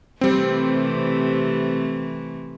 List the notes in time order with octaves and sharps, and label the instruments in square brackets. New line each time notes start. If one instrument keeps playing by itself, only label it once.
[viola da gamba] C3 E3 A3 [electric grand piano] G3 C4